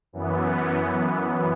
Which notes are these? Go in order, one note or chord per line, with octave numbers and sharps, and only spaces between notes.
F#2 E3 B3